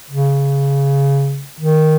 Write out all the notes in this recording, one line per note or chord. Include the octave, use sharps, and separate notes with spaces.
C#3
D#3